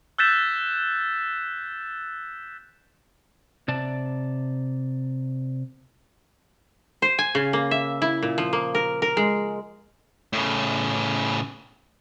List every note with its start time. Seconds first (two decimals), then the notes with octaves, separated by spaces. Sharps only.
0.18 E6 F#6 G6 A6 B6 E7
3.68 C3 D5 A5
7.02 C5
7.19 G#5
7.35 C#3
7.53 A#3
7.71 E5
8.02 E4
8.22 A#2
8.38 F3
8.53 A#3
8.75 A#4
9.02 A#4
9.17 G#3
10.33 A2 C#3